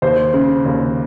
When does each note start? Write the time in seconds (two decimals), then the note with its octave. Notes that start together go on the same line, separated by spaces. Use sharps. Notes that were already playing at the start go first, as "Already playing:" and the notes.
0.02 D#2 C5
0.34 C#3
0.65 D#2